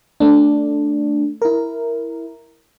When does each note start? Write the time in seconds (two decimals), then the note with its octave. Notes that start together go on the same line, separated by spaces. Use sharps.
0.20 A3 D4
1.42 E4 A#4